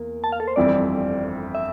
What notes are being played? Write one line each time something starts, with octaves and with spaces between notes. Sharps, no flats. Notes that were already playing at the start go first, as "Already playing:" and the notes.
Already playing: E2 A#3
A5
F5
A4
C5
G1 F2 E3 G3 C4 D5
E5